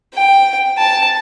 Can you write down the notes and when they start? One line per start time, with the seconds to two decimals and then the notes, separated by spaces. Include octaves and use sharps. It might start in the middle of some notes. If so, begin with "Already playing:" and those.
0.14 G5
0.78 A5